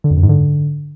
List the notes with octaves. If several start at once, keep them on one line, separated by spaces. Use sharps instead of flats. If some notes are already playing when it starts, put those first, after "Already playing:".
D3
F2
F#2
G#2
D3